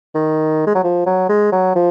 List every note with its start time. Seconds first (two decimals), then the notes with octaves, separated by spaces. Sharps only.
0.15 D#3
0.67 G#3
0.75 F#3
0.84 F3
1.06 F#3
1.29 G#3
1.52 F#3
1.76 F3